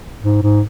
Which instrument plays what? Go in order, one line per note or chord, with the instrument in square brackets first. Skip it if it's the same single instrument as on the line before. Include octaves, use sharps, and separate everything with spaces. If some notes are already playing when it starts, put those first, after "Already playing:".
[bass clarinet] G#2
G#2